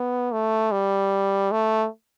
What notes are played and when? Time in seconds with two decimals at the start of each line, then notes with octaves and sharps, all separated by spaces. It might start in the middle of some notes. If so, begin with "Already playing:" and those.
Already playing: B3
0.33 A3
0.72 G3
1.52 A3